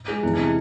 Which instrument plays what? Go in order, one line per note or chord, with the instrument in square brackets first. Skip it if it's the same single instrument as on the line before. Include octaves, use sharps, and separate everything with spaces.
[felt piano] G#3 [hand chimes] G#4
[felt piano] E2 [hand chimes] E4
[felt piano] C3 [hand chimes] D#4
[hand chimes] E4